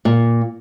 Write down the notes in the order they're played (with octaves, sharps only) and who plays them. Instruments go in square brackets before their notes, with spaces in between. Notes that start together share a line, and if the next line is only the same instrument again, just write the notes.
[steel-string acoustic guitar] A#2